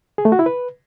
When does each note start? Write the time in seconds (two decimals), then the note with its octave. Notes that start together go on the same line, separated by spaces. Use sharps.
0.18 G#4
0.25 A3
0.32 F#4
0.39 E4
0.46 B4